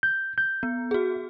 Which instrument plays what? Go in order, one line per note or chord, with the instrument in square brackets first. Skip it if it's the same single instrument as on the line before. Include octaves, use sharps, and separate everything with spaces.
[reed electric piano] G6
G6
[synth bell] B3
F#4 G#4